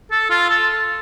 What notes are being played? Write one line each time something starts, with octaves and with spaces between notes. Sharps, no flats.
A4
F4
A4